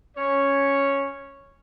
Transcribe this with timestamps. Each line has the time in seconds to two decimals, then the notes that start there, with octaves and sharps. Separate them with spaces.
0.17 C#4 C#5